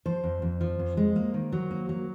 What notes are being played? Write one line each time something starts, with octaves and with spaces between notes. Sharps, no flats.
F3 C5
F2
F2
F3
F2
G#3
A#3
D#3
F#3
A#3
F#3